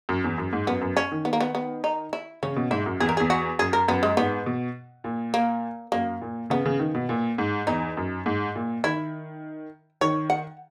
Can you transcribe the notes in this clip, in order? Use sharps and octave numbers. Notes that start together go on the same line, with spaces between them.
F#2
E2
F#2
G#2
F#2 B3
F#2
C#4
D#3
B3
A#3
B3
B3
D#4
E4
C#3 C#4
B2
G#2 E4
F#2
E2 G#4
A#4
E2 G#4
F#4
F#2 G#4
A#4
F#2 B3
G#3
G#2 B3
B2
A#2
A#3
F#2 A#3
A#2
C#3 B3
C#3
D#3
B2
A#2
G#2
E2 D#4
F#2
G#2
A#2
D#3 E4
D#3 C#5
F#5